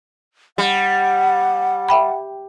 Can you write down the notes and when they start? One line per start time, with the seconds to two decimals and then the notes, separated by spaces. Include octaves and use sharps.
0.58 G3 F#5
1.89 E5 G5 B5